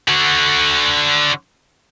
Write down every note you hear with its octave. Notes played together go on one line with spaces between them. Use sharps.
D3 F#4